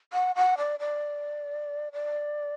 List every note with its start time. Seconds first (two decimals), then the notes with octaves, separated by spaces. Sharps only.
0.13 F#5
0.36 F#5
0.58 D5
0.80 D5
1.93 D5